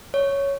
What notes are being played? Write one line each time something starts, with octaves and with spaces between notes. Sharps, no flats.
C#5